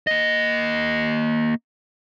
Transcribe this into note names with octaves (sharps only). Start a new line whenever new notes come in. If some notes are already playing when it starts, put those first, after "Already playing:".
A#3 D#5